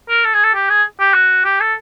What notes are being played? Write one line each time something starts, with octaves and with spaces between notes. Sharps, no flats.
A#4
A4
G#4
A4
G4
G#4
G4
F#4
G4
A4